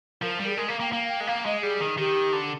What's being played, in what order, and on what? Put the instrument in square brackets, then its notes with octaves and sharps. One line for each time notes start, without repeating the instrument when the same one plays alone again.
[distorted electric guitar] F3 [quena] A#4
[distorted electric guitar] G3
[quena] G#4
[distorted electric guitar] G#3 [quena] A#4
[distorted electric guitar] A#3
[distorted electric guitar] A#3 [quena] G5
[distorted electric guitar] A#3 [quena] F5
[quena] G5
[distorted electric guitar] G#3
[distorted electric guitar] A#3 [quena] F5
[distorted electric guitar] G#3 [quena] D#5
[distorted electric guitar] G3 [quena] G#4
[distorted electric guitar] D#3
[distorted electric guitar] D#3 [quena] G4
[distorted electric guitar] D3